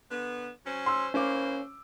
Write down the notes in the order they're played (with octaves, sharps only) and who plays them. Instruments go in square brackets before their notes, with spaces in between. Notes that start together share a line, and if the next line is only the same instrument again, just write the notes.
[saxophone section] D3 B3
F#3 C#4 C5
[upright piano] C6 E6
[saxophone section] E3 A#3 C5 [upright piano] C#4 D6